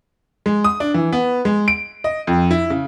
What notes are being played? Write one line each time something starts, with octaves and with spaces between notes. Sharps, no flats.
G#3
D#6
D4
E3
B3
G#3
D7
D#5
F2
E4
C#3